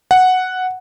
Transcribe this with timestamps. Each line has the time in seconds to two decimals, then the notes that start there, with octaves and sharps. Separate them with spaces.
0.11 F#5